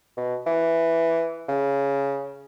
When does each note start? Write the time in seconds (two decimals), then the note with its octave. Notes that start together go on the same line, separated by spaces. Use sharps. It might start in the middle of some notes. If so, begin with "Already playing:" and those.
0.17 B2
0.47 E3
1.49 C#3